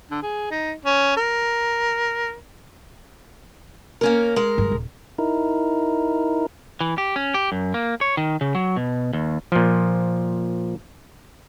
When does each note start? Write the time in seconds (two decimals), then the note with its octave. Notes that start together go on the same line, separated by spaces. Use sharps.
0.10 D3
0.22 G#4
0.51 D#4
0.85 C#4
1.17 A#4
4.01 A#3 C#4 A#4
4.36 G#3 A#4
4.58 G2 D3
4.71 D#1
5.18 D#4 E4 A#4
6.81 E3
6.98 G4
7.16 C#4
7.34 G4
7.52 F#2
7.74 A#3
8.01 C#5
8.17 D#3
8.41 C#3
8.55 F#3
8.76 B2
9.13 D#2
9.52 A#2 F3